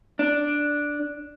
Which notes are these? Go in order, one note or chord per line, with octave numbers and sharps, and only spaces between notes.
D4